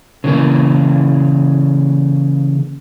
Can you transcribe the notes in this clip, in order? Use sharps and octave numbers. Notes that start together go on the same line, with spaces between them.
C#3 E3 A#3